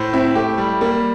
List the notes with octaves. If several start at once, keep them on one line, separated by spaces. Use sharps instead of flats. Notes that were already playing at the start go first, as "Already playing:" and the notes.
Already playing: A2 C5
C4 E4
A3 G4
G3
G3 A#3